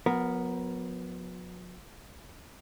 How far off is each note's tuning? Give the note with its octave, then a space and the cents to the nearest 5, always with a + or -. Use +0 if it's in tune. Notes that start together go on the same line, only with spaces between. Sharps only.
F#3 -45 B3 +0 A#4 +10